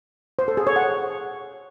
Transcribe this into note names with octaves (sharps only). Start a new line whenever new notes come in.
C5
A4
G#4
C#5
F#5